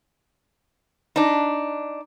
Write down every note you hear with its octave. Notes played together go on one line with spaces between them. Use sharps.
D4 D#4